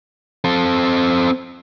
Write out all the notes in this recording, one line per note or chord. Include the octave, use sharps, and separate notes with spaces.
C4 A4